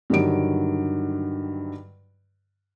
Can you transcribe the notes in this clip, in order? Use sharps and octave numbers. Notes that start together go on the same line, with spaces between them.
G2 D3 D#3 F#3 D7